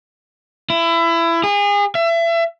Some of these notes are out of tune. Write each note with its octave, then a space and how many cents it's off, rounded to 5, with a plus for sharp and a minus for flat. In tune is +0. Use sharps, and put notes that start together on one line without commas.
E4 +25
G#4 -35
E5 +30